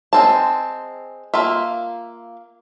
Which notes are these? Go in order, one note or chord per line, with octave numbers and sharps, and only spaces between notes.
G#3 C4 A5
A#3 F4 E5